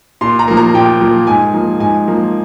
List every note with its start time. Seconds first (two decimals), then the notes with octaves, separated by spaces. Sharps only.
0.21 A#2 C6
0.39 A#5
0.48 F3 A#3
0.57 A#5
0.74 A#2 G5
1.01 F3 A#3
1.27 G#2 G#5
1.54 F3 A#3
1.80 G#2 G#5
2.07 F3 A#3